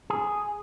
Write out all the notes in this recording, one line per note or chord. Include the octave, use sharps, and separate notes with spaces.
G#4